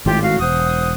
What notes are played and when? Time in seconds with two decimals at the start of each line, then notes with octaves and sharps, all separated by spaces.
0.06 G#1 A2 F4 G4
0.23 F#4 F5
0.40 E1 C5 F#5 D#6